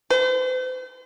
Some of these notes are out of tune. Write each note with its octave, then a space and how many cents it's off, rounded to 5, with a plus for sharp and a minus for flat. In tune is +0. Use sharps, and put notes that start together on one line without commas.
C5 -40